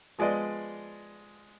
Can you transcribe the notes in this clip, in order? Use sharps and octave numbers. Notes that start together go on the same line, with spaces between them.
F3 G#3 B3 D5 D#5